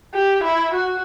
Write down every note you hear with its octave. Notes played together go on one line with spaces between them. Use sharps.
G4
E4
F#4